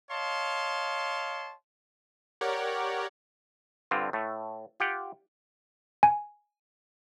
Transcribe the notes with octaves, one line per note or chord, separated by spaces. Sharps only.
C#5 D#5 F5 A5 C6
G4 A#4 C#5 D5 F#5
G2 D3 C4 F4
A2 A3
F4 G4 F#5 G5
G#5